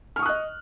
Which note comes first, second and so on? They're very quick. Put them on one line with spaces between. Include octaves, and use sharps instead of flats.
F6 C#6 D#6 F#6 D#5